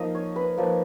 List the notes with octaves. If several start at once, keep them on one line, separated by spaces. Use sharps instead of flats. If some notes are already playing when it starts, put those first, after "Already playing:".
Already playing: F3 A#3 D#4 D#5 F5
C#5
B4
F3 A#3 D#4